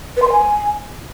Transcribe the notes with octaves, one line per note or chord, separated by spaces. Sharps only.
B4
C6
B4
G#5